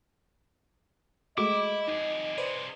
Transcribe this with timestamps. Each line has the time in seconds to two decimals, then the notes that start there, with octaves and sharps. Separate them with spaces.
1.38 G#3 A3 E4 F#4 D#5 D6
1.88 F2 D#4 G#4
2.38 C3 G#4 B4 C5 D5